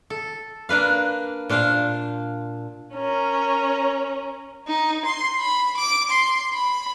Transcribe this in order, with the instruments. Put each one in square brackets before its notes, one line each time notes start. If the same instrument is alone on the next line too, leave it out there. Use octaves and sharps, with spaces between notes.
[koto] A4
A#3 D4 B4 F5
A#2 D4 C5 F5
[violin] C#4 A#4
[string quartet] D#4
C6
B5
D6
C6
B5